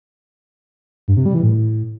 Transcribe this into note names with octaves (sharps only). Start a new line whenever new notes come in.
G2
C3
G3
E3
A2